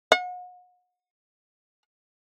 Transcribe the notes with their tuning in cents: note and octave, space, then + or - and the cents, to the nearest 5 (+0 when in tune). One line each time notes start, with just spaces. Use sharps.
F#5 -40